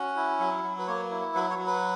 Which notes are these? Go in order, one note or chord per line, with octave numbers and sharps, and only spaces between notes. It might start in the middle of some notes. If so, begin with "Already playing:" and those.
Already playing: C#4 F#4
E4
F#3
F#3
B4
A#3 C#5
E4
F#3 B4
C#5
F#3
B4